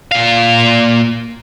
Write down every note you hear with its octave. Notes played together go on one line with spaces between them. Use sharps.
A#2 F5